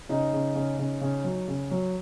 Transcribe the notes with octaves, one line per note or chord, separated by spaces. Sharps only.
C#3 D#4
C#3
C#3
C#3
C#3
F#3
C#3
F#3